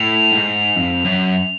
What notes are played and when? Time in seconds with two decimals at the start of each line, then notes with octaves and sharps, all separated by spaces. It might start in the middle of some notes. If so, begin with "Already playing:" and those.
Already playing: A2 F7
0.32 G#2
0.76 F2
1.05 F#2